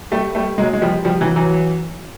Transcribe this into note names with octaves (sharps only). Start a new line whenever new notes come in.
G3 A3
G3 A3
F#3 G#3
G#3
F3 G3
F3 G3
E3 F#3
E3 F#3